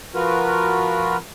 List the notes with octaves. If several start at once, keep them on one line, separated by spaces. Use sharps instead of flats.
F3 F4 F#4 A#4 B4